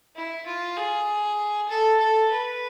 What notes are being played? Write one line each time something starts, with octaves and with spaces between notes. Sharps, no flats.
E4
F4
G#4
A4
A4
B4